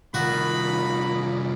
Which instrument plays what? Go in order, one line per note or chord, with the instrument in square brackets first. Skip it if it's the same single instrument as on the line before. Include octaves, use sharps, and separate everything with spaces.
[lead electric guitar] C2 F4 [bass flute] D#3 [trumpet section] D#4 B5 [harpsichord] F#4